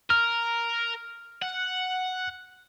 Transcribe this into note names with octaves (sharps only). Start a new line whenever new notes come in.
A#4 F6
F#5